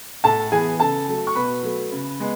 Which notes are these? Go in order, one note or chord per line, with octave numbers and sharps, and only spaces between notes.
A2 A4 A5
E3 B3 G#4 G#5
C#3 A4 A5
F#3 A3
C#6
B2 B4 B5
F#3 A3
C#3
G#3 B3